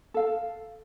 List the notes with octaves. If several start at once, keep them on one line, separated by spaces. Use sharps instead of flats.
A4 F5